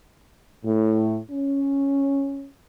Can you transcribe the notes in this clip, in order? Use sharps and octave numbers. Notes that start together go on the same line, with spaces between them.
A2
C#4